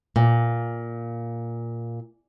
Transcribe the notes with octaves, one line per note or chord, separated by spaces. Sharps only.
A#2